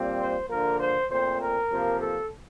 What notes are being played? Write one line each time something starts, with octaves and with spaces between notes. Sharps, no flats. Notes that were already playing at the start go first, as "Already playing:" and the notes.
Already playing: A#2 G3 C4
C5
D3 F3 A#3 A#4
C5
A#2 A3 C4 C5
A#4
C3 F3 A#3
A4